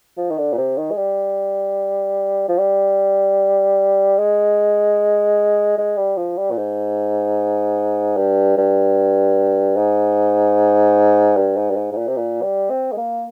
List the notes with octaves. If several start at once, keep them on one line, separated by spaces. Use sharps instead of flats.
F3
D#3
D3
A#2
C3
D#3
G#3
G3
F3
G3
G#3
G#3
G3
F3
G3
A#2
G#2
G2
G2
G#2
G2
G#2
G2
G#2
G#2
A#2
C3
A#2
G3
C4
G#3
A#3